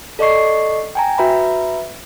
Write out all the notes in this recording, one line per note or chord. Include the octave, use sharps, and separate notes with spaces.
A4 D5 D#5 C#6 C7
G5 G#5 A#5
F#4 B4 E5 A#5 B5